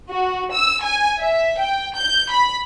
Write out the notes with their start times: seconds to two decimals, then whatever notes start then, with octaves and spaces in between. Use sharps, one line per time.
0.10 F#4
0.52 E6
0.85 G#5
1.20 E5
1.59 G5
1.96 G6
2.31 B5